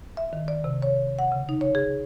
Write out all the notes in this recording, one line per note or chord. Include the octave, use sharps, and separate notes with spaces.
E5
D#3
D5
C3
C#5
F#5
C#3
D#4
C#5
G#4